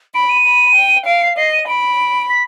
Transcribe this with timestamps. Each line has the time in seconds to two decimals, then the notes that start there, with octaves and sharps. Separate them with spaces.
0.14 B5 D7
0.29 D#7
0.45 B5
0.75 G5
1.05 F5 D7
1.21 C7
1.37 D#5 C7
1.52 D#7
1.66 B5 D7
2.29 B6